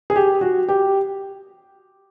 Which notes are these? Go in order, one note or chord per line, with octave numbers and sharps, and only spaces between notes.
G#4
G4
F#4
G4